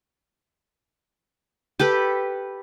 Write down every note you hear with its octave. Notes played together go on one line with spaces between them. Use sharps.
G4 A4 B4